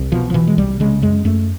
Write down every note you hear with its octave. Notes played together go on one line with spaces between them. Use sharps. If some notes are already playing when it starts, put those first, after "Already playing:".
Already playing: C2
B2 F3
F3
B2 E3
G#3
C2 G3
C#3 G#3
F#2 G#3
F#2 A3